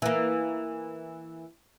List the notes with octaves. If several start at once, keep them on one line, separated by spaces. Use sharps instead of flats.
E3 A#3